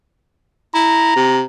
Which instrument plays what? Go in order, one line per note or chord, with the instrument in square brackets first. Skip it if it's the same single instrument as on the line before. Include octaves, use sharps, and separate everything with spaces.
[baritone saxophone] E4 [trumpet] A#5
[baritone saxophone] C3